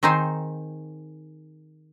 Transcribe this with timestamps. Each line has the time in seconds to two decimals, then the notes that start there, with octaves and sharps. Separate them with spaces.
0.03 D#3 C4 D#4 G#4 C5